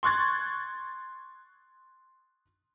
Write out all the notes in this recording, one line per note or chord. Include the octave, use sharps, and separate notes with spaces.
C6 C#6 F#6 G#6 A6